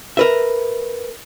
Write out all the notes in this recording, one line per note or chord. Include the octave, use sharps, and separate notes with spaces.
A#4 B4 E5